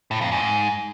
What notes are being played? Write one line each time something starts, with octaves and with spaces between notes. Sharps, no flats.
A2
F2
G#2